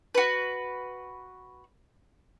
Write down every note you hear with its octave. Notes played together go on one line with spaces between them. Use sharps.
F#4 B4